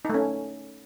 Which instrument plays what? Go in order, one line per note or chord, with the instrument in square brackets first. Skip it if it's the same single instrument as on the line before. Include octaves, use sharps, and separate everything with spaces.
[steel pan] D#4
A3
C#4